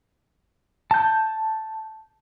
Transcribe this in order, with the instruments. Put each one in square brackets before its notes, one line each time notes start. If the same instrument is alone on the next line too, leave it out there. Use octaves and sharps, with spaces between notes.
[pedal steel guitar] A5 G6